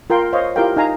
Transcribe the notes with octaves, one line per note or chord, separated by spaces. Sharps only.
F4 A#4 G5 C6
C5 C#5 D#5 F5
E4 F4 G4 A#4 F5 G5
D#4 F5 G#5 A#5